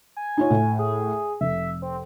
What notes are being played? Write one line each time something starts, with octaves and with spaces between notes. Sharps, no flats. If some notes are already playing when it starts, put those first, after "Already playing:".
G#5
D#4 F4 C#5
A2
G#4
F1 E5
C4